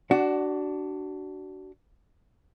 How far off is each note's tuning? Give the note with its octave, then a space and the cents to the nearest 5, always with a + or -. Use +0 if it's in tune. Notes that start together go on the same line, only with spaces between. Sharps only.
D4 +0 F#4 +25 F#5 +0